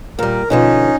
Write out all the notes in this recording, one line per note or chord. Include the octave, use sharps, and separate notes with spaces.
A#2 G3 A#4
B2 D3 F3 C#4 D#4